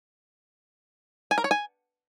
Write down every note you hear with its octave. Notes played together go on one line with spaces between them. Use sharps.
G#5
A#4
C#5
G#5